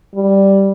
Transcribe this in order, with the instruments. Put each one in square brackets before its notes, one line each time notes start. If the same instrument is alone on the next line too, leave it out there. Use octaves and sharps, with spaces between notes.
[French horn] G3